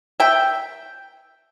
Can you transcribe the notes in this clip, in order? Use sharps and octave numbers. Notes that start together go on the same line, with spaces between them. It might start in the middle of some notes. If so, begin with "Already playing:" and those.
E5 G5